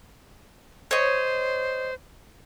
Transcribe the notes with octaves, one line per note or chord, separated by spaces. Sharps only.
C5 C#5 D#5